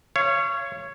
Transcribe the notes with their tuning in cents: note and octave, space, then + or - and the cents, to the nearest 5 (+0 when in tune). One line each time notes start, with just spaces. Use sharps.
C#5 +0 F5 -35